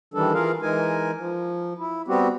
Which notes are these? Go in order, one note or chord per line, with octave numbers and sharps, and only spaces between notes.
D#3 E3 G3 D4 A4
E3 F4 G#4 A#4 F5
E3 G#3 D#4 A#4 G#5
F3
E4
G3 B3 C4 F#4 G4